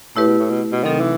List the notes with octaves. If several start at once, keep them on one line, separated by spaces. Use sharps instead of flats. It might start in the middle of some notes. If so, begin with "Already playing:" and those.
A2 A3 E4 G4 B4
B2
A2
B2
B2
C3 D#3 F#3 C4 D#4 A4
E3